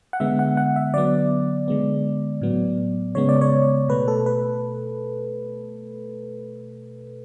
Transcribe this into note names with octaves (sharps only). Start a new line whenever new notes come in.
F#5
D3 G#3 B3 E5
F#5
F#5
E5
D3 F#3 B3 D5
D3 G#3 B3
A2 F#3 B3
C#3 G#3 B3 C#5
D5
C#5
B2 A3 B4
A4
B4